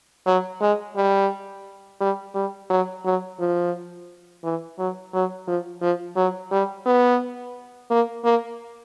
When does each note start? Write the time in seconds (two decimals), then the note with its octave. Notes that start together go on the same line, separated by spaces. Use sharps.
0.26 F#3
0.61 G#3
0.96 G3
2.01 G3
2.35 G3
2.70 F#3
3.05 F#3
3.40 F3
4.44 E3
4.79 F#3
5.13 F#3
5.47 F3
5.82 F3
6.16 F#3
6.52 G3
6.86 B3
7.91 A#3
8.25 A#3